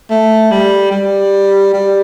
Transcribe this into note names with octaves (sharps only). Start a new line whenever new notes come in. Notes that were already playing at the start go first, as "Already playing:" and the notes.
A3
G3
G3
G3